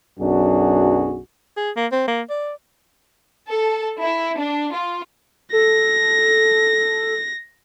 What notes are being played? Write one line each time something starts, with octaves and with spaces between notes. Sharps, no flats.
B1 F#2 D4 F#4 G#4
G#4
A#3
C4
A#3
D5
A4
E4
D4
F4
A4 A#6